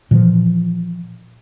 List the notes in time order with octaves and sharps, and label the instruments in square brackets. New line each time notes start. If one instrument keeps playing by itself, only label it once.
[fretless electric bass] A#2 E3 F3